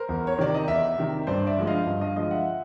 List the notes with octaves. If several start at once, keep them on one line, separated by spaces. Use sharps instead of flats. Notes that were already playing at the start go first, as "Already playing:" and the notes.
Already playing: A#4 C5
E2
C#5
C3 D#3 D5
D#5
E2 D5 E5
C3 D#3
G2 C5 D5
D5 E5
D3 F3 G#3
D#5 F5
G2
D#5 F5
D3 F3 G#3 D#5 F5
E5 F#5